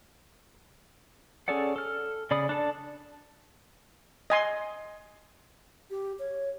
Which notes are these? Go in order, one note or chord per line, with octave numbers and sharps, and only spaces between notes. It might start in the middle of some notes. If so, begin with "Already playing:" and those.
C#4 G#4 A4 D5 F#5
A4 F6
C#3 D5 B5 D#6
D4 A4 A5
D#5 G#5 C6
G4
C#5